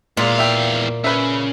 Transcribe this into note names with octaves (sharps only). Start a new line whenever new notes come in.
E2 A#2 G#3 F5
E5 G5
C#3 B4 E5